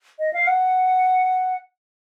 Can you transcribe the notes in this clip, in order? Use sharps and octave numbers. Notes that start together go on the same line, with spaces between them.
D#5
F5
F#5